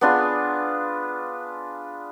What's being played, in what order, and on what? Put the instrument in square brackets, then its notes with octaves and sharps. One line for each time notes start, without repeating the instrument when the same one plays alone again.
[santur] B3 D4 F4 G#4